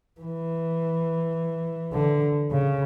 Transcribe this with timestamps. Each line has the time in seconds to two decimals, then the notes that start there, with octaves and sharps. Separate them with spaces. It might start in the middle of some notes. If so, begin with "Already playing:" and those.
0.21 E3
1.93 D3
2.51 C#3